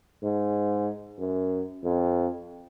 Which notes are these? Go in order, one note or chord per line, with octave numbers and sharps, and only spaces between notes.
G#2
F#2
F2